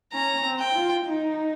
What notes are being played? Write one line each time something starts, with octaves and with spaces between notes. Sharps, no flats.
C#4 A#5
C4
G5
F4
D#4